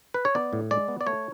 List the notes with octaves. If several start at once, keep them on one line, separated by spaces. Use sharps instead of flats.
B4
C#5
B3 D5
A2
G#3 D5
B3
D5
A3 C#5